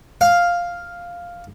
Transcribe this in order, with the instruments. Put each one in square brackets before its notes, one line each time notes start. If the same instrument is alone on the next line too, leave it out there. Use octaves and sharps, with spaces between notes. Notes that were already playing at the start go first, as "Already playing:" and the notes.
[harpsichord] F5